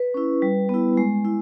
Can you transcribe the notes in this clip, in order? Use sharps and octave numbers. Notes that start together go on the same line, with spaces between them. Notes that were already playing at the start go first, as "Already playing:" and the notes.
Already playing: B4
C#4 E4
G3
B3 E4
G#3
E4